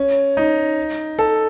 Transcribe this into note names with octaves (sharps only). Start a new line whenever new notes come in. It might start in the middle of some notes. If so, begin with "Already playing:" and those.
Already playing: C#4
D#4
A4